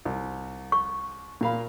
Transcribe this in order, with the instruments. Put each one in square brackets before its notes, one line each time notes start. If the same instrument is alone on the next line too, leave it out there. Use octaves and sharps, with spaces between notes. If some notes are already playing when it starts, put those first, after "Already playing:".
[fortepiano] C2
[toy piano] C#6
[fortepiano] A#2 F5 B5